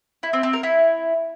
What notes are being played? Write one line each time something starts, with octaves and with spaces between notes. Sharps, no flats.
E4
C4
C4
A#4
E4